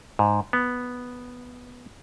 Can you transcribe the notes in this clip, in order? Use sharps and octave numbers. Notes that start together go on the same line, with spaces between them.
G#2
B3